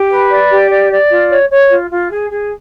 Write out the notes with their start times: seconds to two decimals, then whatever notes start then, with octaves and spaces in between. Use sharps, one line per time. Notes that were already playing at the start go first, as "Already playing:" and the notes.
Already playing: G4
0.10 B4
0.30 D5
0.50 G4
0.70 D5
0.90 D5
1.10 F4
1.30 C#5
1.50 C#5
1.70 F4
1.90 F4
2.10 G#4
2.30 G#4